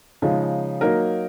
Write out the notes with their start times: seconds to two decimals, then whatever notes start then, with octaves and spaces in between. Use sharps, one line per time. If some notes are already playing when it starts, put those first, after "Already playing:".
0.22 C#3 F3 G#3 D#4
0.81 F#3 A#3 D#4 A#4